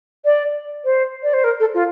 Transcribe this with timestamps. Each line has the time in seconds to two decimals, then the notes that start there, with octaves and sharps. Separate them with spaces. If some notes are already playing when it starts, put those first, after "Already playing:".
0.25 D5
0.85 C5
1.23 D5
1.33 C5
1.44 A#4
1.60 A4
1.74 F4